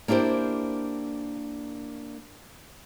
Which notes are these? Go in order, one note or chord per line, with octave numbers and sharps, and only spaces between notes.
A#3 D4 E4 G4 C5